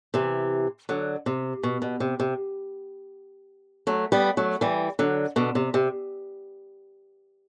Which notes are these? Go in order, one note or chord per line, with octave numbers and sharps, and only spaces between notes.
C3 E3
D3 F#3
C3
B2
B2
C3
C3
F#3 A3
G3 B3
F#3 A3
E3 G3
D3 F#3
B2 D3
C3
C3